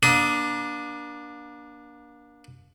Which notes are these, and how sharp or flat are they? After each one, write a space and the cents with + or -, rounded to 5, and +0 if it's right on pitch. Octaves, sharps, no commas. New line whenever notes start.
A#3 +35 D4 +0 D#6 +25